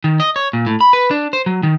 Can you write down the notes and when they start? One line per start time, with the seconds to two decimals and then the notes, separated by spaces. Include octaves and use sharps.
0.04 D#3
0.20 D#5
0.36 C#5
0.53 A#2
0.66 A2
0.81 B5
0.93 B4
1.11 D4
1.33 C5
1.46 F#3
1.63 D#3